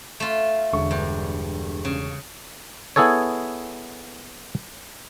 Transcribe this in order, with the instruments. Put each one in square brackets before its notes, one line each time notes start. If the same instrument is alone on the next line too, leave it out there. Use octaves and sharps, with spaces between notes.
[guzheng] A3 F4
[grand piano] E1 D3 C#6
[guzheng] G2
C#3
[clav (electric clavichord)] B3 E4 G#4 A4 C#5